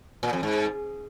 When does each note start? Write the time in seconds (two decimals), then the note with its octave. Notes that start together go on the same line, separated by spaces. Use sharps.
0.23 A#2
0.33 F2
0.43 G#2